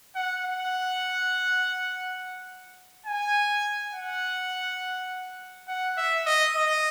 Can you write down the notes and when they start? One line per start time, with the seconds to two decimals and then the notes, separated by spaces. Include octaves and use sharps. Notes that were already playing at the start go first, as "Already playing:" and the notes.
0.15 F#5
0.44 F#5
3.06 G#5
3.94 F#5
5.68 F#5
5.97 E5
6.26 D#5
6.56 D#5